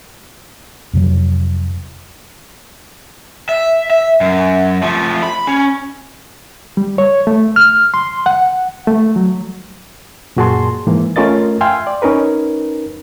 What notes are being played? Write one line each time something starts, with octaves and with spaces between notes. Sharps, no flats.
F2 C3 F#3
E5
E5
F#2
F3 A3
B5
C#4
G3
C#5
A3
F6
C6
F#5
A3
F#3
F#2 A#2 F#4 G#4 A5 C6
G#2 E3 A#3
A3 C#4 F4 A#4 D#5 A6
E5 F5 G5 G#5 C6 F6
D5
C#4 D#4 A#4 B4